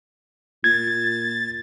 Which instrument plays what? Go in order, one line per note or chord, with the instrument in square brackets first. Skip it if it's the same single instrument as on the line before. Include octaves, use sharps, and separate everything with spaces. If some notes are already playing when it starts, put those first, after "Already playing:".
[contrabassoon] A#2 [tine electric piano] G#6 [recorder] A6